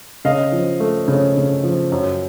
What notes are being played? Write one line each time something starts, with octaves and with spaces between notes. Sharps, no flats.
C#3 D#5 F5
F3
A3
C#3
C#3
F3
F#2